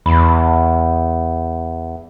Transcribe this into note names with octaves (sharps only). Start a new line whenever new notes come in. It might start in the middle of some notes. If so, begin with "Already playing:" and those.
E2 B5